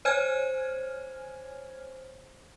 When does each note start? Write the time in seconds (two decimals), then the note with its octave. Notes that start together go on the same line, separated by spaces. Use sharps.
0.05 C5 C#5 G#5 F6 G#6